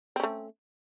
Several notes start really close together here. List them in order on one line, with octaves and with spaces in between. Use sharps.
C4 C#4 A3